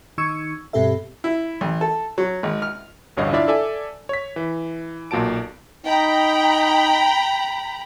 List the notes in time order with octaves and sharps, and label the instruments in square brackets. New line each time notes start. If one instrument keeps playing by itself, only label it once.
[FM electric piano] D#3 D#4 C#6 E6 G#6 C#7
G2 B2 C4 G4 A4 E5
[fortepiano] E4
A1
A4
F#3
G#1
F6
[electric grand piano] A1 D2 G2 C#5 D#5 F5
D4 E4 F4 D5 E5 F5
A4 D5 E5 G#5
C#5 B6
E3
B1 A#2 F#4 A5 D7
[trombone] D#4 [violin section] G5 A#5 B5